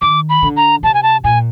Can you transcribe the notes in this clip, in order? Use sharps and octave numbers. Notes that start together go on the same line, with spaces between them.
D#3 D6
B5
D3
A#5
C3 A5
G#5
A5
A#2 G#5